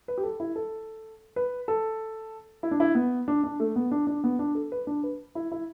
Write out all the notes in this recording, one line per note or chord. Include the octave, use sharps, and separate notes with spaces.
B4
G4
A4
E4
A4
B4
A4
E4
D4
E4
B3
D4
D4
A3
B3
D4
D4
B3
D4
A4
B4
D4
B4
E4
E4